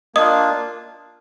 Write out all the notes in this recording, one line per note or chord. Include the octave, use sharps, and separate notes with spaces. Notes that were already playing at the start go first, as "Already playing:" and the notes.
A#3 D4 F4 D#5 D#6